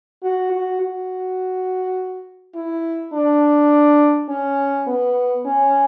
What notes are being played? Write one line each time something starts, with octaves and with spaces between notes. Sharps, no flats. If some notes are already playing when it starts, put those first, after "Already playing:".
F#4
F#4
F#4
E4
D4
C#4
B3
C#4